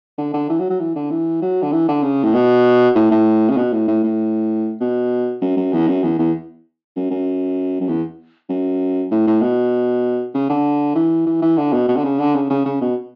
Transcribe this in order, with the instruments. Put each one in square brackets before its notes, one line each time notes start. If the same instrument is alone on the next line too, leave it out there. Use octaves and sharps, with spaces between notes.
[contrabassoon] D3
D3
E3
F#3
F#3
E3
D3
E3
F#3
D3
E3
D3
C#3
A2
B2
A2
A2
C#3
B2
A2
A2
A2
B2
F#2
F#2
E2
F#2
E2
E2
F#2
F#2
F#2
E2
F#2
A2
A2
B2
C#3
D3
E3
E3
E3
D3
B2
B2
D3
C#3
D3
C#3
C#3
C#3
B2